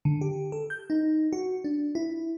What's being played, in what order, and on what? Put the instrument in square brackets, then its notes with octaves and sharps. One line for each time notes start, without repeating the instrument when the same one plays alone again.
[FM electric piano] D3
G4
A4
G6
D#4
F#4
D4
E4